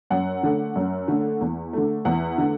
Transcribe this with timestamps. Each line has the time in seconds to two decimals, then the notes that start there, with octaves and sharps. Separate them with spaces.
0.10 F#2 F#5
0.43 D3 A3
0.76 F#2
1.08 D3 A3
1.41 E2
1.73 D3 A3
2.05 E2 F#5
2.38 D3 A3